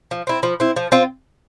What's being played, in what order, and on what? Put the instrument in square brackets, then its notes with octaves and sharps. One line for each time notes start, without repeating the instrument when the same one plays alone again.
[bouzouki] F3
C4 E4
F3
C4 E4
F3
C4 F4